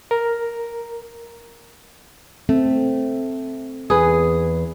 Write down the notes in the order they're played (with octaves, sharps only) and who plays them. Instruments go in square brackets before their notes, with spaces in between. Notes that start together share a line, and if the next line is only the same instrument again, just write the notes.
[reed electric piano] A#4
[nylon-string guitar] A3 [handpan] C4
[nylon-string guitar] E2 B4 [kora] G#4